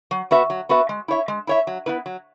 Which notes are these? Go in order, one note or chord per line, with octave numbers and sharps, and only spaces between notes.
F#3
B3 F#4 B4 E5
F#3
B3 F#4 B4 E5
G#3
E4 C#5 E5
G#3
E4 C#5 E5
F#3
B3 E4 B4
F#3